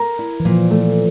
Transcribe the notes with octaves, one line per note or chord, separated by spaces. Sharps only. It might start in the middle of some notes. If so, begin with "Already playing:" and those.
Already playing: A#4
E4
E3
A#2 F3
A3